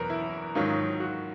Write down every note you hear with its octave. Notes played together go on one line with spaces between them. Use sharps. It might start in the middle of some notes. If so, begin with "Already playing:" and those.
Already playing: E2 B2 F#3 A#4 B4
E4
G#2 D#3 F#3 F4
F#4